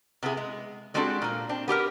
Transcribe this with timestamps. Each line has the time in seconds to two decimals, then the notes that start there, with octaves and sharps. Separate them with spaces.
0.23 C3 B3 E4 G#4
0.37 G#3
0.94 G3 G#3 C4 D4 F#4 A4
1.22 A#2 A#3
1.49 C4 D4
1.68 B3 G4 G#4 A#4